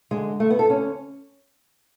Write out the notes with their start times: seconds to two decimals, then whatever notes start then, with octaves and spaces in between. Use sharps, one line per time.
0.11 F#2 D3 G#3
0.40 A3
0.50 B3
0.59 A4
0.69 D2 D3 C#4